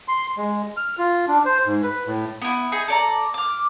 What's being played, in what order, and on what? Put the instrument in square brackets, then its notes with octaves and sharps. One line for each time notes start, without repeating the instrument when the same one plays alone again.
[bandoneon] C6
G#3
F6
F4
D4
C5
G#2
B4
A2
[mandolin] B3 E4
D#4 G#4
A4 D5 A#5
D6 F6